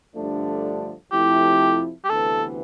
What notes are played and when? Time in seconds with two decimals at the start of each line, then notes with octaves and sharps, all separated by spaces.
0.15 G2 D3 F3 A3 D4
1.12 F2 C3 F3 A3 E4 G4
2.04 G4
2.09 D2 C3 E3 B3 A4